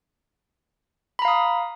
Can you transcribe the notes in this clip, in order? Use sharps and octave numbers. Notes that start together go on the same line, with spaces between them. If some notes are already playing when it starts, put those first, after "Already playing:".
F5 A#5 B5 D#6